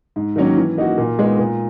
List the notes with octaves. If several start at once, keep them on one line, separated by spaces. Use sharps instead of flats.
G#2
D#3 F#3 A#3 C#4
E3
A#3 D#4 F#4
A#2
G#3 B3 D#4
A#2